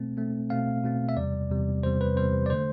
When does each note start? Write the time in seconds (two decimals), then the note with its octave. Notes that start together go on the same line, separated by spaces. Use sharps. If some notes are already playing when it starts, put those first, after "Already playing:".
Already playing: B2 A3 C4
0.17 B2 A3 C4
0.50 B2 A3 C4 F5
0.83 B2 A3 C4
1.09 E5
1.17 E2 C3 G3 D5
1.50 E2 C3 G3
1.83 E2 C3 G3 C5
2.01 B4
2.17 E2 C3 G3 C5
2.46 D5
2.50 D3 A3 C5